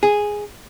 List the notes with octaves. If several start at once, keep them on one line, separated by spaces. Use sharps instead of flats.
G#4